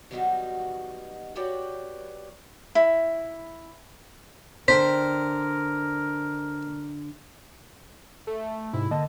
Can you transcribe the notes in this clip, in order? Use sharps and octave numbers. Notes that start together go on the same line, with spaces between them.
D#3 F#3 G3 B3 D#4 F#4
F#4 G4 B4 C#5 D5 G5
E4
D3 D4 A#4 C5 G5 B6
A3
G#2 C3 E4
D3 A#3 D#5 A5